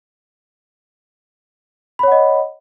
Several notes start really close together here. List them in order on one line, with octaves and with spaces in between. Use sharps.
B5 C#5 F#5 D#5